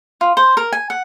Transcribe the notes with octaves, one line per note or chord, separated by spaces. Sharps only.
F4
C5
A#4
G#5
F#5